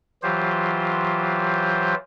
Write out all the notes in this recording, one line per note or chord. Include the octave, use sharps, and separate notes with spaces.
E3 F#3 F4 G4 C5